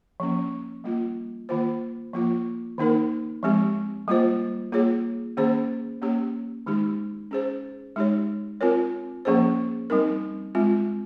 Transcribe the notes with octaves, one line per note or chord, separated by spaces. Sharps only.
F3 A#3 C#4
G3 A#3 F4
D#3 A#3 F4 C5
F3 A#3 F4
D#3 A#3 D#4 A#4
F3 G#3 C4 G4
G3 A#3 F4 C5
A#3 F4 G#4 C#5
D#3 A#3 C#4 G#4 C5
A#3 C#4 G4 C#5
D#3 G#3 D#4 G4
C#4 G#4 C5
G#3 D#4 G4 C#5
C4 F4 A#4 C#5
F3 A#3 C#4 G#4 C5
G3 C4 D#4 A#4
G#3 C4 F4